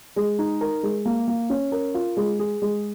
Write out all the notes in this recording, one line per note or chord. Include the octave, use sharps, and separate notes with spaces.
G#3
D#4
A#4
G#3
A#3
A#3
C#4
A#4
F4
G#3
G#4
G#3